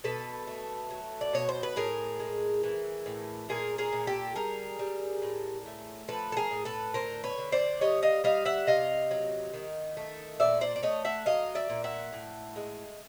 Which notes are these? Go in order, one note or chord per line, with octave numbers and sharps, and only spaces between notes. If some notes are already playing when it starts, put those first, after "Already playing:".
B2 A4 B4
A3
F#3
D5
B2 C#5
C5
B4
A2 G#4 A#4
G#3
E3
A2
A#2 G#4 A#4
G#4 A#4
A#2
G4 A4
G3 G#4 A#4
G3
A2
A3
F3 A4 B4
A4
G#4 A#4
A2
A4 B4
D3 A#4 C5
B4 C#5
D3
C5 D5
G3 C#5 D#5
D#5 F5
G3 D#5 F5
E5 F#5
C3 D#5 F5
F#3
D#3
A3
A#2 D5 E5
C5 D5
D5
A3 C#5 D#5
E5 F#5
F#3 D#5 F5
D5 E5
A#2
E5 F#5
A2
G#3